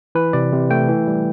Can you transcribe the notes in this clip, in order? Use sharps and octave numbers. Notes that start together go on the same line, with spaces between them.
E3 B4
C3 D5
C3
A3 G5
E3
G3